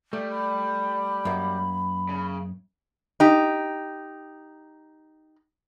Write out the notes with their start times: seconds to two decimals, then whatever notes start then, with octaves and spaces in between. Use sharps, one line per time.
0.13 G3 A3
0.31 B5
1.25 F#2 A#3
2.09 C#3
3.20 D#4 G4